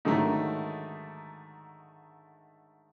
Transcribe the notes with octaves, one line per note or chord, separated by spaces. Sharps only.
G#2 D3 D#3 F#3 A3